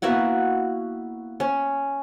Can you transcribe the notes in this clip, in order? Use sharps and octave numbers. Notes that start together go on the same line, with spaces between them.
A#3 B3 E4 F#4
C#4